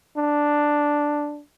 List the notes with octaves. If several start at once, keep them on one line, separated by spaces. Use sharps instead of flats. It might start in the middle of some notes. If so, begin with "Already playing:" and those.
D4